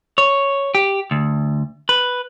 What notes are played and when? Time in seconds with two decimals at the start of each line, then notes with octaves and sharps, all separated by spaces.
0.18 C#5
0.75 G4
1.11 D2
1.89 B4